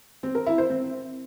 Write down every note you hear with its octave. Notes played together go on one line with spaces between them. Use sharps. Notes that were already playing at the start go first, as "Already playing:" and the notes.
C4
A#4
E4
C5
C4